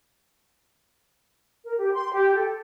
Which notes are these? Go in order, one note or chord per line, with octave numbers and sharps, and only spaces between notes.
A#4
G4
C6
G4
A4